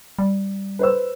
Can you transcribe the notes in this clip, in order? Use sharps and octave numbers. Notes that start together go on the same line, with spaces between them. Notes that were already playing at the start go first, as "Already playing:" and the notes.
G3
B4 C5 E6